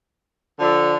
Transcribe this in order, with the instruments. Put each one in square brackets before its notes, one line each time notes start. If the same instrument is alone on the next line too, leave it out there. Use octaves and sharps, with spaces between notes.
[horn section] D3 F3 D4 A4